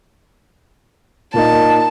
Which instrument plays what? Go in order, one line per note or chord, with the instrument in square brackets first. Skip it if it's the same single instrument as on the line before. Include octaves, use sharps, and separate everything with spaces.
[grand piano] A#2 A#3 D#4 [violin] A5